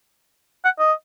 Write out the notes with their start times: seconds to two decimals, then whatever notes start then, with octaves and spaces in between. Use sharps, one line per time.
0.64 F#5
0.79 D#5